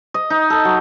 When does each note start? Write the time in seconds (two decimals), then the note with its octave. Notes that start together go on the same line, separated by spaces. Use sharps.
0.14 D#5
0.30 D#4
0.50 A4
0.65 F#3